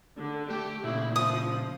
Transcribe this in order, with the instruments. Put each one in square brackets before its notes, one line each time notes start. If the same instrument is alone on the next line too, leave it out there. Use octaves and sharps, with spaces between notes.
[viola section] D3
[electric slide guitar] A3 [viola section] G4
[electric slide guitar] A#2 C#3 [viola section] E4
[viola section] F3 [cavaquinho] D#6